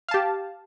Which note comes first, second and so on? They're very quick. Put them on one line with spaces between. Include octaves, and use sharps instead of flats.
F5 A5 G4